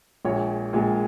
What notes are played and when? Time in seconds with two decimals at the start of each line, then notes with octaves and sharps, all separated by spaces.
0.25 A#1 A#2 G#3 C#5
0.73 A#1 A#2 G#3